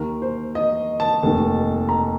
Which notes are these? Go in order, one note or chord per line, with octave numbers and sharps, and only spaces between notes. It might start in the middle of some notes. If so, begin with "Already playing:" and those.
Already playing: D#2 D#3 A#4
C5
D#5
A5
F1 D#2 D#3
A#5